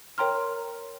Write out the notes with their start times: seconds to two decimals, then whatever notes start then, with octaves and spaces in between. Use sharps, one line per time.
0.18 A#4 C#5 G5 A#5 C6 F6